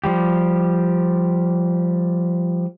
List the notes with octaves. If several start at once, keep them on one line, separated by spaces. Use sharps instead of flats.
F3 G3 G4